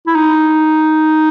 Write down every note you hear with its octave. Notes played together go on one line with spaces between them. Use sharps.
E4
D#4